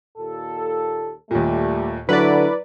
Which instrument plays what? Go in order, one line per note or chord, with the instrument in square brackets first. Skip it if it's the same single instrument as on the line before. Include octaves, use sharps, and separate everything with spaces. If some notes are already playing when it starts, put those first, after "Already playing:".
[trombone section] D#2 A#2 A4
[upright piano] D#2 A#2 [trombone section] G3 A3
[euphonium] D3 [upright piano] F#3 [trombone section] E4 [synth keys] B4 D5